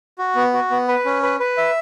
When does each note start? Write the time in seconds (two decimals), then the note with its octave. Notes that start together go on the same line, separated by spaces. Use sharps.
0.19 F#4
0.35 B3
0.53 F#4
0.71 B3
0.88 B4
1.05 C#4
1.23 B4
1.40 B4
1.57 E5